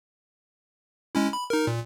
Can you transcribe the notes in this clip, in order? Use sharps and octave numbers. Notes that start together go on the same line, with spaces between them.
G#3 C#4 E4
B5
D#4 A#4
A#2